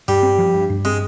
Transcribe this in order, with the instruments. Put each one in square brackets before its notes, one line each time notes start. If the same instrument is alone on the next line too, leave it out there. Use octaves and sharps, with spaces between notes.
[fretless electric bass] G2 [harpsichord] G3
[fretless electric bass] C4
F3
G2
G2
[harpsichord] G#3 [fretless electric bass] C4